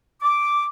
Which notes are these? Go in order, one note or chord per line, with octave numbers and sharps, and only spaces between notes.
D6